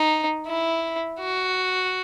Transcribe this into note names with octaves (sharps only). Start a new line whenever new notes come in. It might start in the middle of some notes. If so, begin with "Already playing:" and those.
Already playing: D#4
E4
F#4